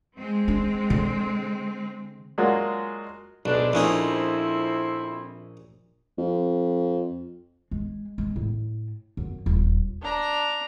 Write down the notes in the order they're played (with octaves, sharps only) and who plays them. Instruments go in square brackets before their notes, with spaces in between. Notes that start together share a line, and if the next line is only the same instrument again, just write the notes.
[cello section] G#3 C4
[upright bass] D4
D3
[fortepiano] F#3 G#3 A#3 D4 F4 F#4
[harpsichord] B1 [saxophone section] G#2 D4
[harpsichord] A#1 C#4 D#4 [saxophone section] F2 C4 E4
[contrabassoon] F2
[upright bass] G#3
G#3
A2
F#2
D#1
[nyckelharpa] D4 A#5